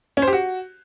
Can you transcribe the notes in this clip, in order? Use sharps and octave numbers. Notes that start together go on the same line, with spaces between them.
C#4
C5
G4
F#4